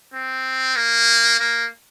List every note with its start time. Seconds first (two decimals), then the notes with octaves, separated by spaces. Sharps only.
0.13 C4
0.76 A#3
1.39 A#3